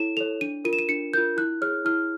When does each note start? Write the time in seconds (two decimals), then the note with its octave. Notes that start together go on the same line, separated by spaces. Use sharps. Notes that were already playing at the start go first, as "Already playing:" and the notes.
Already playing: E4 A4 C#5 E7
0.17 A4 C#5 F7
0.41 D4 D#7
0.65 F4 A#4 D#7
0.73 E7
0.79 D#7
0.89 D4 C#7
1.14 F4 A#4 G6
1.37 E4 F#6
1.62 G#4 C#5 F6
1.85 E4 F6